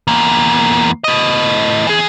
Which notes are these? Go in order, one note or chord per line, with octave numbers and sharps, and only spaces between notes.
E2 A#3
A2 D#5
E3 G#4